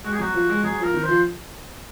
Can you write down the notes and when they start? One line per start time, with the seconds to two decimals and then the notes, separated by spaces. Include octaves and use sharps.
0.04 G#3 F#4
0.13 G#4
0.19 F#3 F#4
0.34 F3
0.50 G#3
0.64 F#3 G#4
0.79 F3 A#4
0.94 D#3
1.03 C5
1.09 F3